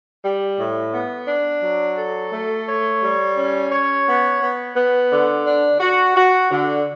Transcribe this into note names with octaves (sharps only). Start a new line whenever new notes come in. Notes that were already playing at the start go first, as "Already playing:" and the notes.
G3
A2
B3
D4
F#3
A4
A3
C#5
G3
C#4
C#5
B3
B3
B3
D3
D4
F#4
F#4
D3